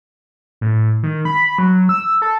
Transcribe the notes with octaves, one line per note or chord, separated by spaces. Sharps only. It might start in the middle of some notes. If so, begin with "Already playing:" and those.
A2
D#3
B5
F#3
E6
A4